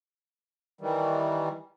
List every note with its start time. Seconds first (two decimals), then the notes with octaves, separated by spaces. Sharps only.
0.81 D#3 E3 G3